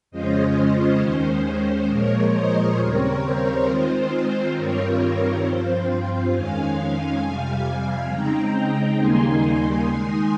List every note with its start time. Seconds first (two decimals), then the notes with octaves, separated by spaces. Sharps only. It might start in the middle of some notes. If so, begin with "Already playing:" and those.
0.11 F2 C#3 G#3 C#4 F4 C5 D#5
1.00 D#2 D#3 G#3 C#4 C5
1.88 A#2 F3 G#3 A#4 C#5
2.33 C5 D#5
2.77 D#2 C#3 G3 C4 A#4 C#5
3.21 C5
3.65 D#3 G#3 C4 F4
4.54 G2 D#3 G3 C4 F4 A#4 C#5
5.43 G2 F3 C4 F4 C5
6.31 F2 D#3 G#3 C#4 F5 G#5
7.21 F2 C3 G3 F5 G#5
8.09 C#3 G#3 C4 D#4 G5 A#5
8.98 D#2 C#3 G3 A#3 D#4 G#5 C6
9.43 G#5 C6
9.87 D#3 G#3 D#4